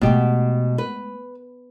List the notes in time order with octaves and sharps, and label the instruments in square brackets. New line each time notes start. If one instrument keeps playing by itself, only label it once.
[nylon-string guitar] B2 G4 [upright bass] G#3 A3
[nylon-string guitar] B4